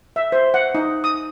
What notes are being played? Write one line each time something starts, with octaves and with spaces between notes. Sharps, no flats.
E5
C5
F#5
D#4
D#6